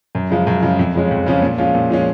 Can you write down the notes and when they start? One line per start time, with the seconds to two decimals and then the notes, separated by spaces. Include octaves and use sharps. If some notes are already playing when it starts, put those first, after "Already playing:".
0.15 F#2
0.30 C#3 F3 G#3
0.47 F#2
0.63 C#3 F3 G#3
0.79 F2
0.95 C#3 F3 G#3 C#4
1.11 F2
1.26 C#3 F3 G#3 C#4
1.42 A#2
1.58 F3 G#3 C#4 F4
1.75 A#2
1.90 F3 G#3 C#4 F4